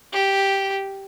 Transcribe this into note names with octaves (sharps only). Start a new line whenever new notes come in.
G4